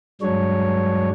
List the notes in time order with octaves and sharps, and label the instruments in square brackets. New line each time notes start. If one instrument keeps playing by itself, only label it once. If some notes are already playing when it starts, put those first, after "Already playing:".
[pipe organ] G2 F#3 G#3 D4 C#5